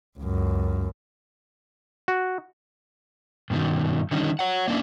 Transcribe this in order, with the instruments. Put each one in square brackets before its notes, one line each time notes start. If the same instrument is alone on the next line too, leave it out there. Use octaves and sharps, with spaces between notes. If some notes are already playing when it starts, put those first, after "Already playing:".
[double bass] C#2 F#2
[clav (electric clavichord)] F#4
[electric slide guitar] G2 B2 D#3
D3 D#3 G3 C#4 D#4
C#5 F#5
A#3 C#4 D4 E4